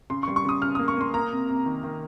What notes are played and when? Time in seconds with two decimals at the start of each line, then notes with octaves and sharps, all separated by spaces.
0.10 C#3 C6
0.23 C#6
0.28 G3
0.36 C#6
0.45 C#3 D#6
0.62 C#3 F6
0.75 A#3 D#6
0.88 C#6
0.97 A#3 C6
1.14 A#3 A#5
1.32 C3
1.49 C3
1.66 D#3
1.84 D#3